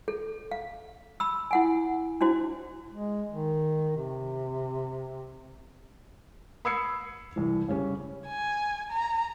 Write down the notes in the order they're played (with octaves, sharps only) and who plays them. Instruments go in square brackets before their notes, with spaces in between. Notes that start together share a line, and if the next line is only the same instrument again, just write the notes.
[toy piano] A4
F5
B5 E6
E4 F#5 G#5
D4 E4 F#4 C5
[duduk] G#3
D#3
C3
[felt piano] B5 D#6 E6 G#6 C7 C#7
C2 E3
C#3 G3 C#4
[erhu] G#5
A#5